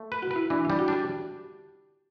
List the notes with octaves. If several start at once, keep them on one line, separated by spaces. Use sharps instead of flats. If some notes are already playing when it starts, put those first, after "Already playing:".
Already playing: A3
B4
F#4
B4
E4
E3 D4
E4
G3
F#4
D4 G4